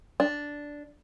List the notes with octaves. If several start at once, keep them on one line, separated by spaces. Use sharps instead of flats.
D4